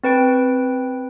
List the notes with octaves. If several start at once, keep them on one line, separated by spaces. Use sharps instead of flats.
C4 B4 G5 D7